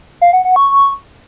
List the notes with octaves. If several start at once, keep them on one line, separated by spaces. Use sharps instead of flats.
F5
F#5
F#5
C#6